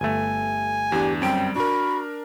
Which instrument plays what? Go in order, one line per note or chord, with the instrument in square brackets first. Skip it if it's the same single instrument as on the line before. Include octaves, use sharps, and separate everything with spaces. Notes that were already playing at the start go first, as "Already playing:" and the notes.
[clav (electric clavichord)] G1 A3 [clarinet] G#5
[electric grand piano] E2 D4 [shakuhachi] G4
[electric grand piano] F#2 C4 D7 [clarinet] G3 [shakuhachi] G5
[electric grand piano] D4 A#4 [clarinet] F#4 [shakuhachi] B5